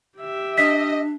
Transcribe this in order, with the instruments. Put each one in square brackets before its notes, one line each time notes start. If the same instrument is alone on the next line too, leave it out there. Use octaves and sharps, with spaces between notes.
[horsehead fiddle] G4 E5
[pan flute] D4 [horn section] D#5 [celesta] B6